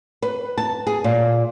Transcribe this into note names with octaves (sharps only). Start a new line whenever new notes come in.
B4
A5
G#4
A#2